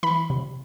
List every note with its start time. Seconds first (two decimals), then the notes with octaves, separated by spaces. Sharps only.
0.03 E3 B5
0.30 C3